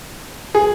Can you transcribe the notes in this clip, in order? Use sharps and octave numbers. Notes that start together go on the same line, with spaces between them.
G#4